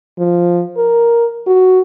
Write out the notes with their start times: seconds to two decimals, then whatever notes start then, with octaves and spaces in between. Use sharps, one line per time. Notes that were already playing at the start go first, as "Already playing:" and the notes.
0.18 F3
0.77 A#4
1.47 F#4